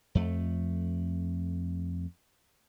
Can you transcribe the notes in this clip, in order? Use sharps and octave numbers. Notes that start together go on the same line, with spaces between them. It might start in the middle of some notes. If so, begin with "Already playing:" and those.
F2 A3